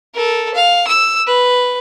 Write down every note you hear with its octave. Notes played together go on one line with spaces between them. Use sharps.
A4 A#4
F5
E6
B4